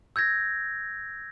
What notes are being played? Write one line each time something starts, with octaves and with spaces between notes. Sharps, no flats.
E6 G6 G#6 A#6